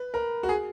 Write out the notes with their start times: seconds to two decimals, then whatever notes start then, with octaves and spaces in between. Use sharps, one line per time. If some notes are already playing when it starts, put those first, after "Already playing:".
Already playing: B4
0.14 A#4
0.43 F#4
0.49 G#4